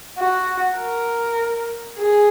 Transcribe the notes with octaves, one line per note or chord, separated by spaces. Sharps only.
F#4
A#4
G#4